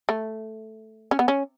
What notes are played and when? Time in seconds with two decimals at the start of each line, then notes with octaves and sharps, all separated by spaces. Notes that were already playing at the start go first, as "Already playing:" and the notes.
0.09 A3
1.11 C#4
1.19 B3
1.28 C#4